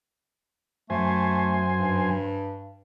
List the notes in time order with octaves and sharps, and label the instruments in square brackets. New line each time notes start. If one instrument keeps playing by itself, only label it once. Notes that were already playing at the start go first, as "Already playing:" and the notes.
[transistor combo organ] F#2 C5 G#5 [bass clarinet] A3
[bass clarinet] G2